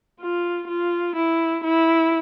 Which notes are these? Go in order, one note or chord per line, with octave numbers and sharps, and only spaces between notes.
F4
F4
E4
E4